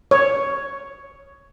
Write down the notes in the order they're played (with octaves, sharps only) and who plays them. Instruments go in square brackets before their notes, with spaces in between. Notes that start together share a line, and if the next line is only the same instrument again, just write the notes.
[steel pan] C#5